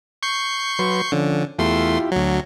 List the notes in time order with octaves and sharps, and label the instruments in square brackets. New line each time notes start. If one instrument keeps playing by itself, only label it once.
[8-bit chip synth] C#6 G6 C7
[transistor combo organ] F#3 B4 C6
[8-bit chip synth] D3 [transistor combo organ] F3 C#4
[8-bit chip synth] E2 A3 C6 [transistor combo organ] E4 F4 G4
[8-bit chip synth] D2 F#3